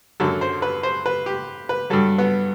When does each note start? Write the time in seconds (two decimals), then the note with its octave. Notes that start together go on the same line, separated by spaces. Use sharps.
0.20 F#2 D3 F#3 A4
0.41 C5
0.62 B4
0.83 C5
1.06 B4
1.26 G4
1.69 B4
1.90 G2 F#3 A4
2.18 B3